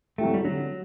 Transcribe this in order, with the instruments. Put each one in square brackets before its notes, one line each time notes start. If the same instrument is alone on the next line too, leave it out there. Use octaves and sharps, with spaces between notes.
[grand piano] F#3 C4 E4 G4 [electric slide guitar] A3
[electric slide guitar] G3
[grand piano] D3 [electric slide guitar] F#3